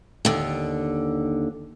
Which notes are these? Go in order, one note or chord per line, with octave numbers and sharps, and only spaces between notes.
D#2 D3